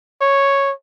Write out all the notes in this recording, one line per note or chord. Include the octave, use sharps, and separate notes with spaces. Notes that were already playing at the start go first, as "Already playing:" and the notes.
C#5